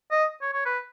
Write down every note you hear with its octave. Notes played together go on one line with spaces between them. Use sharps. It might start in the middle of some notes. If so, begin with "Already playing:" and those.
D#5
C#5
C#5
B4